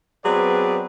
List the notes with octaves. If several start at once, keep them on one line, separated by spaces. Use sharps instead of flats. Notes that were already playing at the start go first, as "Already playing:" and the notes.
F#3 B3 C4 G#4 B4 D5